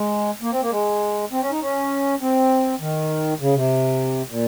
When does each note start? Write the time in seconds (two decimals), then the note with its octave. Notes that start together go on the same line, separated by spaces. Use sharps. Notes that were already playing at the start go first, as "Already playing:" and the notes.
Already playing: G#3
0.42 A#3
0.52 C4
0.62 A#3
0.71 G#3
1.32 C4
1.42 C#4
1.51 D#4
1.62 C#4
2.21 C4
2.80 D#3
3.41 C#3
3.55 C3
4.30 A#2